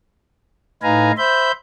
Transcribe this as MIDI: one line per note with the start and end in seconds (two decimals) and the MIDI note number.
0.83 1.12 45
0.83 1.12 63
0.83 1.12 71
0.83 1.12 77
0.83 1.12 80
0.83 1.12 82
1.18 1.52 72
1.18 1.52 76
1.18 1.52 83
1.18 1.52 91